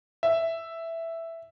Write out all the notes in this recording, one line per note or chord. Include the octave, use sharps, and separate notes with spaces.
E5